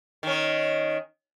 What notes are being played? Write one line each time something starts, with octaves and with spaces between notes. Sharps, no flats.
D#3 C#4